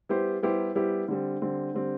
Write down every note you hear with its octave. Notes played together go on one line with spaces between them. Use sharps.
G3 B3 E4 G4 C5
G3 B3 E4 G4 C5
G3 B3 E4 G4 C5
D3 G3 C4
D3 G3 C4
D3 G3 C4